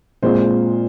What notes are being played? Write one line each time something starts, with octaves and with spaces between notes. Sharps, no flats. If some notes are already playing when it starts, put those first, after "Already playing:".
A#2 G#3 C4 F4 C5